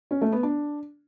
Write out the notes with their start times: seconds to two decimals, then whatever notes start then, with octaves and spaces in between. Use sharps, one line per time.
0.11 C#4
0.22 A3
0.32 B3
0.43 D4